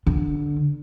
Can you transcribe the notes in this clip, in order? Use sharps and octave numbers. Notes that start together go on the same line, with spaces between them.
D3